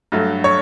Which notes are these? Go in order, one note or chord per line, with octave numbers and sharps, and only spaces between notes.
G2 F#3 A3
C#5 C#6